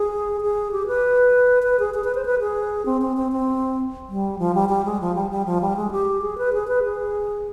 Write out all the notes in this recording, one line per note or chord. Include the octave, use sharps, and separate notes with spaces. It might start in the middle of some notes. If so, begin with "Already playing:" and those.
Already playing: G#4
G#4
G4
B4
B4
G#4
G#4
B4
C5
B4
G#4
C4
C4
C4
C4
G3
F3
G3
G3
G#3
F3
G3
G3
F3
G3
G#3
G4
G#4
B4
G#4
B4
G#4